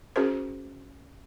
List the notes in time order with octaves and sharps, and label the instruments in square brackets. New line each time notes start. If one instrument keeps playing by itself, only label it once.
[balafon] C#4 F#4 G#4 A#4 C5